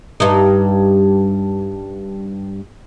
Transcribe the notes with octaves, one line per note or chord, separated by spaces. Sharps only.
G2 D#4